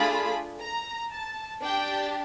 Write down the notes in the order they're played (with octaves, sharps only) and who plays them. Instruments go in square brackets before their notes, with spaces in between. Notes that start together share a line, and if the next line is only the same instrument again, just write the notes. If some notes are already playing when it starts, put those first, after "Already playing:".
Already playing: [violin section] A3 D4 F4 G#4 B5
A#5
A5
D4 G4 G5